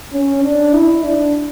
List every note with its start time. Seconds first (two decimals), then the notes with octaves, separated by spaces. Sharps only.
0.13 C#4
0.44 D4
0.73 E4
1.04 D4